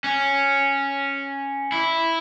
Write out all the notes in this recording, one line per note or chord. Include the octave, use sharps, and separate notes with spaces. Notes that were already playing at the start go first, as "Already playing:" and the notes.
C#4
E4